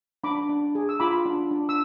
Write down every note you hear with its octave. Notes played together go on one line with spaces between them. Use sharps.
D4 B5 D6
D4
G#4
E6
F4 B5 D6
D4
D4
E6